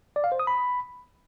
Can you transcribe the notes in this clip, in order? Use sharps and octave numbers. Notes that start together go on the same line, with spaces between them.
D5
F5
C5
D#6
B5